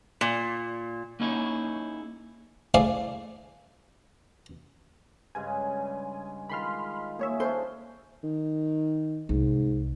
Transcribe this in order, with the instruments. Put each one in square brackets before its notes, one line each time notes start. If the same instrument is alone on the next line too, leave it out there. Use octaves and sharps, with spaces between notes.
[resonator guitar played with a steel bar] A#2
[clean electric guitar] A#3 C#4 D#4 E4 G#4 C#5
[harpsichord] A3 E4 G#4 C5 D5 F5
[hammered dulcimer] G2 C#3 G#3 [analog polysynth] G#5
[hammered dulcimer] D#3 G#3 F4 [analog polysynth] B5 C6 F6
[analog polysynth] A#3 C#5 E5 [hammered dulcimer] G#4
[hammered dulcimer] C#4 D4 [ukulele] C5
[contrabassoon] D#3
[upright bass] C2 [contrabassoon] G#2